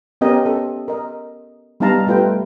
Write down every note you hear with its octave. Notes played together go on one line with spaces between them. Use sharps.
B3 C#4 G4 A#4 D#5 F5
A4
A#4 D#5
G3 B3 D#4 F5 A5 A#5
G3 A3 F4 B4 G5